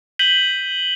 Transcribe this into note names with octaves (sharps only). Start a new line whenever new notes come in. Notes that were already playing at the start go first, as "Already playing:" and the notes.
G6 B6 D#7 F#7 G7